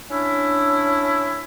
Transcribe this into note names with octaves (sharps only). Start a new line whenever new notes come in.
C#4 D4 E4